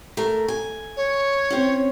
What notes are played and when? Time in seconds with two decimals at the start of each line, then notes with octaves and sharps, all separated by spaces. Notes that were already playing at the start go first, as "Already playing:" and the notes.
0.17 A3 A#4
0.48 G#5
0.97 C#5
1.50 C4 C#4